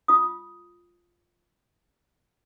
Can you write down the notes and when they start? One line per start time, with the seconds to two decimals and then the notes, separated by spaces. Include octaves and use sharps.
0.08 F4 D#6